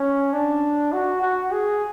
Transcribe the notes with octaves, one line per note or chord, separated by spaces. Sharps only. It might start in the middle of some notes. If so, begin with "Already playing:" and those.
Already playing: C#4
D4
F#4
F#4
G#4